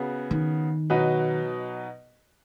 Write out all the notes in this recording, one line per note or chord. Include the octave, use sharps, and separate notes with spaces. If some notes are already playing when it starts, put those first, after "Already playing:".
Already playing: C#3 B3 F#4
D#3
B2 F#3 D#4 F#4 B4